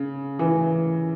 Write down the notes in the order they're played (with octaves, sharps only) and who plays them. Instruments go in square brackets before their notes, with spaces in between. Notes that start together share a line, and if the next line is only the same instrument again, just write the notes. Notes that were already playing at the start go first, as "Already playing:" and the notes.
Already playing: [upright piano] C#3
E3